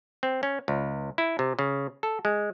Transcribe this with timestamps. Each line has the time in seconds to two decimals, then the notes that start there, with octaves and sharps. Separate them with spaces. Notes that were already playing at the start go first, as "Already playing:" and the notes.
0.23 C4
0.43 C#4
0.68 C#2
1.18 E4
1.39 C3
1.59 C#3
2.03 A4
2.25 G#3